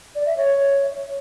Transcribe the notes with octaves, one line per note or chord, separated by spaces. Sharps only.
D5
E5
C#5